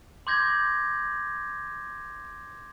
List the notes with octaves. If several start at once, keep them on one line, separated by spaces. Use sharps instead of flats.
C6 D6 G6 G#6 A#6